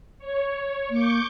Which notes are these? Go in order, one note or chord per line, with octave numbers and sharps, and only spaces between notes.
C#5
A#3 C#6 D6 G6